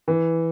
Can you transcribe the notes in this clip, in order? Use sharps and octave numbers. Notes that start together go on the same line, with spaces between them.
E3